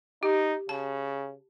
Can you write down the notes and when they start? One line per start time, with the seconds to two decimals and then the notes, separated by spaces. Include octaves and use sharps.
0.23 D#4 G4
0.69 C#3 A5